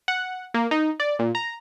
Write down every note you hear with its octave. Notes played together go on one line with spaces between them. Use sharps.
F#5
A#3
D#4
D5
A#2
A#5